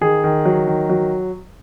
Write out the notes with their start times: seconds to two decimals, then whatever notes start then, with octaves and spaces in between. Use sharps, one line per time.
0.01 D#3 G#4
0.24 D#3
0.45 F#3
0.67 D#3
0.90 F#3